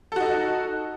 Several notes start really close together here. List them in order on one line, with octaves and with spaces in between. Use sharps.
A4 F#4 D#4